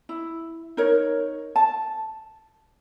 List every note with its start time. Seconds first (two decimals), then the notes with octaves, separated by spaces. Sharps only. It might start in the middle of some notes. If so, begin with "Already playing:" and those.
0.09 E4
0.77 D#4 A#4 C#5
1.56 A5